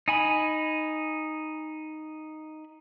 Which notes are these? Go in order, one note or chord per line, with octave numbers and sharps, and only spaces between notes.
D#4 G#5 B5